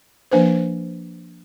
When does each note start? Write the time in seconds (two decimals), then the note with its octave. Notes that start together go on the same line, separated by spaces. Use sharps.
0.32 F3 A#3 D4 B4 C5